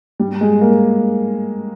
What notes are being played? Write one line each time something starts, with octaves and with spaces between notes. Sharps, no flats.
G3
G#3
A#3